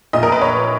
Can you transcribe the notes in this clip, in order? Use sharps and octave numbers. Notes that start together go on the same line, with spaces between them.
A#1 A#2 D#5
A#4
B4
C#5